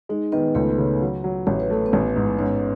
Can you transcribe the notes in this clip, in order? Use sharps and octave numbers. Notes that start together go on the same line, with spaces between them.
G#3 D#4
D#3 B3 B4
C#2 A3 A4
C#3
F#3
F#3
A1 C#5
B4
A3 A4
B3 B4
A1
G#2
G#2 C#4 C#5